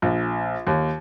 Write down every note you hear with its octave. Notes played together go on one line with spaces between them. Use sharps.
A#1
D#2